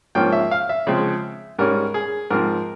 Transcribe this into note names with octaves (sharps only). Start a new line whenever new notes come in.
G#2 F3 A#3 C#4 G5
E5
F5
E5
C#3 F3 G#3 C4
G#2 G3 C#4 A#4
G#4
G#2 F3 C4 A#4